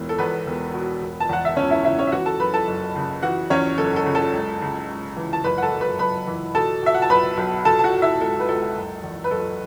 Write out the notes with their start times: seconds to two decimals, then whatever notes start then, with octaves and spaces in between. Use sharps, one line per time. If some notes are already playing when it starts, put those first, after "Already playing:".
Already playing: E1 E3
0.09 A4
0.18 E2 B3 B4
0.47 E1
0.74 B2
1.01 E1
1.20 A5
1.29 E2 F#5
1.45 E5
1.56 E1 C#4 C#5
1.71 E4 E5
1.85 C#3 E4 E5
1.98 C#4 C#5
2.07 E5
2.12 E3 F#4 F#5
2.26 A4 A5
2.40 F#2 B4 B5
2.54 A4 A5
2.67 F#1
2.95 C#3
3.22 E3 F#4 F#5
3.50 E2 C#4 C#5
3.78 F#1 A4
3.96 A4
4.06 C#3
4.15 A4 A5
4.33 C#2
4.61 C#3
4.88 C#2
5.17 E3
5.33 A5
5.44 F#1 B4 B5
5.58 F#5
5.62 A4 A5
5.72 F#2
5.81 B4 B5
5.99 F#1 B4 B5
6.27 E3
6.55 B2 A4 A5
6.82 B2 E5
6.94 F#5
7.02 A5
7.10 B1 B4 B5
7.37 B1
7.65 B2 A4 A5
7.79 A5
7.84 F#4 F#5
7.93 B2
8.02 E4 E5
8.20 C#2 A4
8.40 B4
8.48 C#2 A4
8.76 F#1
9.03 E2
9.24 B4
9.31 F#1 A4